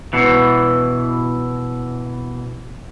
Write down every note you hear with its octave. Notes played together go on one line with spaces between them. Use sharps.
B2 E3